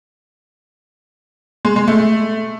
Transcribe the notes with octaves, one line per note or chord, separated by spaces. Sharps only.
G#3
G#3
A3